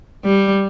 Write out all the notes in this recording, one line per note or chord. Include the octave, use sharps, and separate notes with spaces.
G3